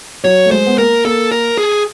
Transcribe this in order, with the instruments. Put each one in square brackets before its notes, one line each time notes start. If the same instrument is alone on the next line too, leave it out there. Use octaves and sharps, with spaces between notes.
[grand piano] F#3 [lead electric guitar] C#5
[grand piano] A3
[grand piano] G#3 [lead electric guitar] C5
[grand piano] B3
[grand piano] A#3 [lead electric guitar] A#4
[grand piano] A#3 [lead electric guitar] A4
[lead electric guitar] A#4
G#4